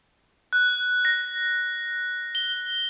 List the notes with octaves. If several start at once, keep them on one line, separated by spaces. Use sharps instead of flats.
F#6
A#6
G7